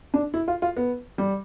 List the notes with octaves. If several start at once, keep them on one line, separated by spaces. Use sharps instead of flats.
D4
E4
F4
F4
B3
G3